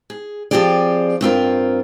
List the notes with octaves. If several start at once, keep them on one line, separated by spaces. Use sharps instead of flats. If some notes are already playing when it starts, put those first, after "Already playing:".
G#4
F3 C4 F4 G4 G#4 D5
G2 C4 F4 A#4